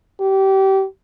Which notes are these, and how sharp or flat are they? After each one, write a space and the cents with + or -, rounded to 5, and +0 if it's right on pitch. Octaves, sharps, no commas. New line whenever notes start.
G4 -25